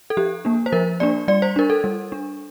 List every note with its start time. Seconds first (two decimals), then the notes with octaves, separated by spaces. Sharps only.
0.10 A4
0.17 F3 G4
0.45 A#3 D4
0.66 C5
0.72 F3 A#4
1.00 A#3 D4 D5
1.28 G3 D5
1.42 C5
1.56 D4 A#4
1.70 A4
1.84 G3
2.12 D4